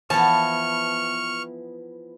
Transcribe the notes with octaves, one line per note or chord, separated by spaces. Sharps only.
E3 F3 B3 A5 C#6 F6